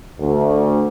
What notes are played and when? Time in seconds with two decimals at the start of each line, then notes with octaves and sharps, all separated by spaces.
0.20 D2